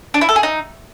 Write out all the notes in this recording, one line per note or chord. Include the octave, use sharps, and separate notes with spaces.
D4
E4
A4
G#4
D#4